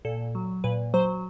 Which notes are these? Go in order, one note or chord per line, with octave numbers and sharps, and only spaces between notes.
A#2 A4
F#3
A#2 B4
F#3 C5